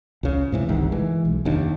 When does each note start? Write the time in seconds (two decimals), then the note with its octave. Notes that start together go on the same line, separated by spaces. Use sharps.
0.23 C#2 C#3
0.52 G#2 C3 E3
0.69 G1 C2 D#3
0.92 E3 G#3
1.25 B1
1.45 F1 D#2 D4